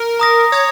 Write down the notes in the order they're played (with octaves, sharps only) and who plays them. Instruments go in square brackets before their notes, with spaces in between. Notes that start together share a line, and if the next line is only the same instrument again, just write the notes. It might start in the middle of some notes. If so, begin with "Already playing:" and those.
Already playing: [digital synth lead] A#4
[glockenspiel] A#5 D#6 A#6
[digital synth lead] C#5 [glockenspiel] D#6 G#6